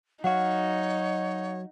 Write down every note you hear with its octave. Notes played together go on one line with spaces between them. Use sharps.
F#3 D#4 F#4 C#5 F5 F#5